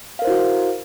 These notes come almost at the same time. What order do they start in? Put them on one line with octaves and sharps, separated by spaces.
F5 A#4 C5 E4 F#4